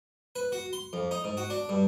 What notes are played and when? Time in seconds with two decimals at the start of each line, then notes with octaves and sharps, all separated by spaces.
0.36 B4
0.52 F#4
0.73 C6
0.93 F2
1.11 D#4
1.24 G#2
1.37 F#4
1.50 D4
1.69 G2